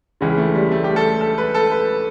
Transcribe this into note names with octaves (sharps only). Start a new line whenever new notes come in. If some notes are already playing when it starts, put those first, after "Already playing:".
C#2 C#3 E3
A3
G3
A3
G4
A4
A4
B4
A4
B4